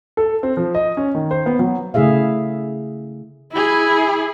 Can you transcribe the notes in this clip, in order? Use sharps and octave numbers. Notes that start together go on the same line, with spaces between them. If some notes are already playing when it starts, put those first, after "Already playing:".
A4
C4
F3
D#5
C#4
D#3
C5
B3
F#3
C#3 A3 E4 G#4 E5 F5
E4 G#4